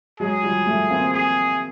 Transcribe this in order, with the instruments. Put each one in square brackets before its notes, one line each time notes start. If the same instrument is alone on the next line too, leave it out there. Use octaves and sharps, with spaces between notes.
[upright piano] F#3 G#3 [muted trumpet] G#4
[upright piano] F3 G3
G3 A3
A#3 C4
[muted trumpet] G#4